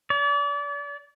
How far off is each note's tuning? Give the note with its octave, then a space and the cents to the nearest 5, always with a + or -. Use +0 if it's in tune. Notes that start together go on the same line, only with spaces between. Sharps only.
D5 -35